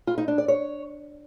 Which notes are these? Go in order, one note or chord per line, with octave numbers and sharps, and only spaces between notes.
F4
D#4
D4
D5
C#5